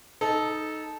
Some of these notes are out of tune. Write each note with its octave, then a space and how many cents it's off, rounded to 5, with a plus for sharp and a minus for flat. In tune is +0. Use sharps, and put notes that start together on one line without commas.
D#4 +0 A4 -15